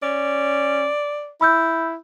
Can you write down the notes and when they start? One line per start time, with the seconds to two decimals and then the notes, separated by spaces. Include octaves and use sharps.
0.03 C#4 D5
1.41 E4 B5 E6 G6